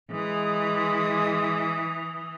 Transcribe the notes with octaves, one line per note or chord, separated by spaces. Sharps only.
E3 G#3 D#6